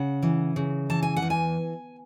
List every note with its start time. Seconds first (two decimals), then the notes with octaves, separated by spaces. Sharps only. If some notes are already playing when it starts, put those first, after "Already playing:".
Already playing: C#3 F#5
0.23 E3
0.56 C#3
0.90 E3 A5
1.03 G#5
1.16 F#5
1.22 E2
1.30 G#5